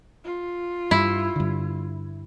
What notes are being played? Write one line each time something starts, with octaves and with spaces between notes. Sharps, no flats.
F4
G2 E4
G2 D3